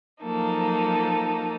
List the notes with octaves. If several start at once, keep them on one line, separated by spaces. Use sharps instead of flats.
F3 F#3 A#3 D#4 A4